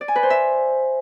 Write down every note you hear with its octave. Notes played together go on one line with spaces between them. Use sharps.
D5
G#5
B4
C5
E5